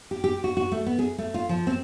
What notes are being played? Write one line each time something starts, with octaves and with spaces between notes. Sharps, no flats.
G4
G4
F#4
F#4
A3
B3
G#4
A3
F4
F3
C4